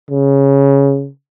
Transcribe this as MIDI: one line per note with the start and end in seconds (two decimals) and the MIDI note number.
0.11 1.08 49